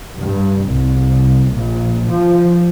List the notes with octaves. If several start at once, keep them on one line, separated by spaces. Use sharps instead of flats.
G2
C2
A#1
F3